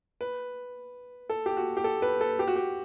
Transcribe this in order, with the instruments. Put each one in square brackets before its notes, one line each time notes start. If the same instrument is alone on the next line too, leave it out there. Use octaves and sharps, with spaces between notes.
[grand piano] B4
A4
G4
F#4
G4
A4
B4
A4
G4
F#4
G4